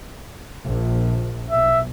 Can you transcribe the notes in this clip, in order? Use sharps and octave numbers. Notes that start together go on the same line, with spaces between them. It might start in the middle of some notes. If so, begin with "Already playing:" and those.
A#1
B1 E5